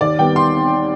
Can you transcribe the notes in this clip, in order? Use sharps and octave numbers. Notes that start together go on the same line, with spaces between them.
D#2 D5
D#3 G3 B3 G5
C6